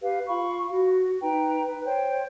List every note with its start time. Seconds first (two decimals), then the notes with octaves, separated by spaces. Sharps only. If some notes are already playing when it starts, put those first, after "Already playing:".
0.01 G4 B4 F5
0.28 F4 F5 B5 C#6
0.69 F#4
1.22 D#4 B4 G5 A#5
1.65 B4
1.85 C5 C#5 G5